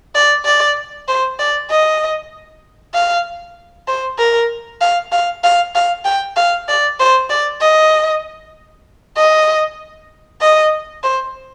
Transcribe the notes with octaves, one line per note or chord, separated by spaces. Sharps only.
D5
D5
C5
D5
D#5
F5
C5
A#4
F5
F5
F5
F5
G5
F5
D5
C5
D5
D#5
D#5
D#5
C5